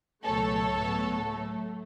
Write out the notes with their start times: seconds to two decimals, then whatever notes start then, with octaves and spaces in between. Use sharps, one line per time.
0.23 C#2 B2 F#3 A3 A4 C#5
0.73 A2 F#3 B3
1.23 A2 F#3 A3